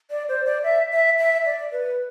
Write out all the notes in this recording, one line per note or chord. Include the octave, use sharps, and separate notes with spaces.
D5
C5
D5
E5
E5
E5
D5
B4